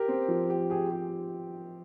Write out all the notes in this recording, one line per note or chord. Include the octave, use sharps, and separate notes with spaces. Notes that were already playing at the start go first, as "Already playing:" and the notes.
Already playing: G4 A#4
C4
F3
G4
G4 G#4
G4